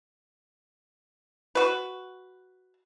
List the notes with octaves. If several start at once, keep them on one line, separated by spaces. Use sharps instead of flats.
F#4 B4